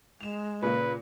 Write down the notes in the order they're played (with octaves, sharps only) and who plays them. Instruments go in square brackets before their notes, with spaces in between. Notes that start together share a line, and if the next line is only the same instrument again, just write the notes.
[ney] G#3 [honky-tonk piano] E7 F7
[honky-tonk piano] A#2 C#3 A#3 [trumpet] B4